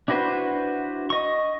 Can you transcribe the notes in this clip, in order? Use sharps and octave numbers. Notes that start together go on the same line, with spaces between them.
D4 E4 F#4 B4 C5
D#5 C#6